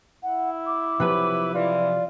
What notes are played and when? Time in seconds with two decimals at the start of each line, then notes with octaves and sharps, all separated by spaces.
0.23 E4 F#5
0.66 D6
1.00 C3 F3 F#3 B4
1.54 E3 F4 D5